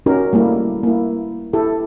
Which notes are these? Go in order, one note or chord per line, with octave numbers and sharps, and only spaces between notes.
C#4 D#4 F#4 G4 A#4
G3 A3 A#3 E4
A#3 E4
E4 G4 A4